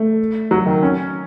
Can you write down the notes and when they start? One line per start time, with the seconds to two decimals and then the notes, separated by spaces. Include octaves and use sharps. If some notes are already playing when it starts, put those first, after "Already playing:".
Already playing: A3
0.51 F#3
0.66 D#3
0.83 C#4